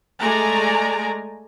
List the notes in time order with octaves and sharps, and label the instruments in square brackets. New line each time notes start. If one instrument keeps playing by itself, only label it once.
[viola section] G#3 A3 D5 G#5 A#5